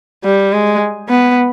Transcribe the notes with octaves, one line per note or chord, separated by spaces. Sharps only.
G3
G#3
B3